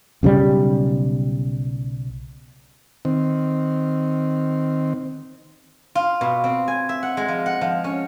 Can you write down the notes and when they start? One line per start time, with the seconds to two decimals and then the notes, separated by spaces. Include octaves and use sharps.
0.23 B1 C#3 E3 G3
3.05 D#3 C4
5.95 F4
6.21 B2
6.44 C4
6.68 G#5
6.89 E5
7.03 F#5
7.17 G#3
7.28 F3
7.46 F#5
7.61 F3
7.84 C#4